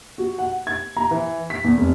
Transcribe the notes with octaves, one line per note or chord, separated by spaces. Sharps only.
F#4
F#5
G#6
A#5
E3
B6
E2
F1